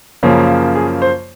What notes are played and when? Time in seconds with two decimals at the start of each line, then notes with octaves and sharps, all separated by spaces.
0.23 F#2 C#3 F3 A#3
0.75 G#4
1.02 C5